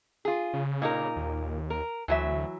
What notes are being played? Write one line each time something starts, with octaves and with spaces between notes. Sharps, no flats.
F4 G#4
C#3
A#2 D#4 A#4
D#2
A#4
D2 E3 F#3 E5